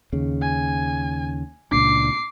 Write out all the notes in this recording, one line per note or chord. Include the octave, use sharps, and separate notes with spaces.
D#2 C#3
G#5
C#2 A#2 D4 D6 C7